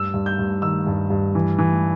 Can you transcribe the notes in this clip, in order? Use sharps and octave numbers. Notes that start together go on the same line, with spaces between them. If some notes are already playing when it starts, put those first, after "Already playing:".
Already playing: G2 E6
G2
G6
G2
D#3 E6
G2
G2
E3
E3